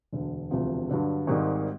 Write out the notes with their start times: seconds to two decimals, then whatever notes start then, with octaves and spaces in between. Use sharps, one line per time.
0.13 E1 D2 D3
0.51 E1 D2 C3 F3
0.89 G2 D3 F#3
1.27 G#1 G#2 D#3 G3